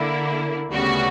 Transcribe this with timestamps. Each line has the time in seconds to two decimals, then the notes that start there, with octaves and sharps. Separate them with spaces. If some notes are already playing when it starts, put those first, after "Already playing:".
Already playing: D3 A#3 E4
0.69 D2 C#3 G3 B3 F#4